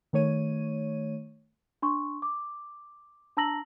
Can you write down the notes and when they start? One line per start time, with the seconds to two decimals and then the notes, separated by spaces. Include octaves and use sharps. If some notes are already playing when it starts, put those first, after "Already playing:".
0.13 D#3 A3 C#5 D#7
1.82 D4 C6 C#6
2.22 D6
3.37 D4 A5 A#5 E6 A#6 F#7